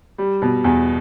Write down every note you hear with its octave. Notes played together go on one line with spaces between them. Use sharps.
G3
B2
E2